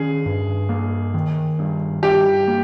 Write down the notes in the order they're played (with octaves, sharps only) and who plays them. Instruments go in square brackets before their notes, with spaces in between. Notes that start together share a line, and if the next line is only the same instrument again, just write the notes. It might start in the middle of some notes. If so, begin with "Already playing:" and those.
Already playing: [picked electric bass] D#3 C#4 [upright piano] G#4
[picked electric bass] G2
A#3
D#3
G2
[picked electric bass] G2 [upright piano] G4
[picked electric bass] A#3